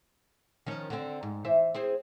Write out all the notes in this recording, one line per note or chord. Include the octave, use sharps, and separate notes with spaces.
D#3 F3 C#4
D3 C4
G#2
E3 C5 E5
C4 G#4 C5